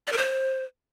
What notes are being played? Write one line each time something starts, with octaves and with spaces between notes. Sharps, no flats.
D5
A#4
C5